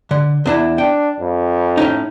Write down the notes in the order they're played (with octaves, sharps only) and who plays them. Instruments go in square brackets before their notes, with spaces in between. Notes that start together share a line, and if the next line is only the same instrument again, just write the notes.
[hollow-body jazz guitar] D3
E2 D4 E4
[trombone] D4 [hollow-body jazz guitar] G5
[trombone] F2
[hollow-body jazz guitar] A2 C#4 D#4